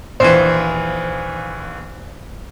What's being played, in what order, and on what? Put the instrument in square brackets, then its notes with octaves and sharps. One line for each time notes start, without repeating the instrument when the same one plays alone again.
[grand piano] A#1 D#2 E3 [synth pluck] C5